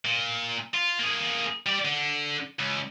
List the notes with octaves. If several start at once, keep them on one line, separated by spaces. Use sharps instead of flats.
A#2
F4
A#3 G#4
G3 D5
D3
C#2